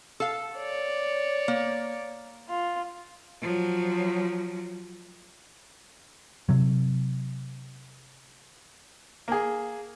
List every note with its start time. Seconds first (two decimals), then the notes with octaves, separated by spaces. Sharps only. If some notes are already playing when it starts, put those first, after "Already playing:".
0.20 A4 F5
0.56 C#5 D5
1.48 A#3
2.49 F4
3.42 F3 F#3
6.49 C3 F#3
9.28 A#3 G#4